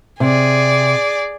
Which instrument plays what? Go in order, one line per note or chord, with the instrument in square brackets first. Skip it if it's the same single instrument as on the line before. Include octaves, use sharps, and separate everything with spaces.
[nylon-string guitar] C3 [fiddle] G#4 D5